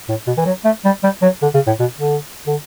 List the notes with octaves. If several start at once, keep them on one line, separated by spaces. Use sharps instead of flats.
A2
B2
E3
F#3
A3
G3
G3
F#3
D3
C#3
A2
B2
D3
D3